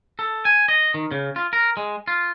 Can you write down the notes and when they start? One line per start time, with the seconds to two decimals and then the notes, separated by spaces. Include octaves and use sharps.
0.19 A4
0.45 G#5
0.68 D#5
0.94 D#3
1.11 C#3
1.36 F4
1.53 A#4
1.77 G#3
2.08 F4